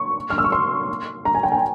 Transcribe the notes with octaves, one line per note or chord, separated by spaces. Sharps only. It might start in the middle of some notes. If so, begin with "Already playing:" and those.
Already playing: C#6
F6
E6
C#6
C6
A#5
G#5
G5
G#5